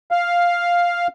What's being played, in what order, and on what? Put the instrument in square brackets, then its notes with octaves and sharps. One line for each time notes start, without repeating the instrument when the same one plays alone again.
[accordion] F5